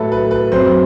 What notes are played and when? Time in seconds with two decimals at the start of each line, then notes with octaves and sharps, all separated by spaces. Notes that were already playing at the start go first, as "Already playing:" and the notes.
Already playing: A2 F#3 A3 A4 B4
0.12 B4
0.31 B4
0.52 F#2 F#3 C4 C5